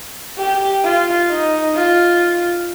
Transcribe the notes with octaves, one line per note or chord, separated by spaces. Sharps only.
G4
F4
D#4
F4